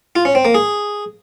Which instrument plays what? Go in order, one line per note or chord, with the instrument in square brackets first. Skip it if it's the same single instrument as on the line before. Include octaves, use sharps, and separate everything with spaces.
[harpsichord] F4
C#4
C4
A#3
G#4